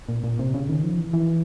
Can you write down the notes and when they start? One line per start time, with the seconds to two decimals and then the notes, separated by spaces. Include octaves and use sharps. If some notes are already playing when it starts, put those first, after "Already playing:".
0.09 A#2
0.24 A#2
0.39 C3
0.54 C#3
0.69 D#3
0.83 F3
0.99 E3
1.13 E3